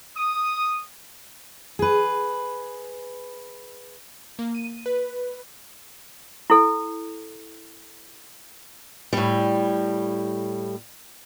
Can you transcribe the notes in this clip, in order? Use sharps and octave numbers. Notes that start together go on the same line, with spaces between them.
D#6
G#4 B4
A#3
D#7
B4
E4 A4
A2 G3